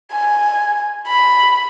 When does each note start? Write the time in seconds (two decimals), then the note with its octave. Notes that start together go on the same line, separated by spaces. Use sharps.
0.12 G#5
1.07 B5